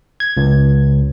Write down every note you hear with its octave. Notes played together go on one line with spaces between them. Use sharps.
G#6
C#2